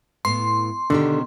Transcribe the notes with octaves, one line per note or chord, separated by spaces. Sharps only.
A2 B3 C6
B2 D3 D#3 G4